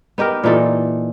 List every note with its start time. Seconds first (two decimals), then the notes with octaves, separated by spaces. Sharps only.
0.18 B3 D#4 G4 A#4
0.44 A#2 E3 D#4 A4